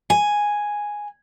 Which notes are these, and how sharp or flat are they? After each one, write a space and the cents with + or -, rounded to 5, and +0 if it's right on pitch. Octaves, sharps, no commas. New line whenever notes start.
G#5 +0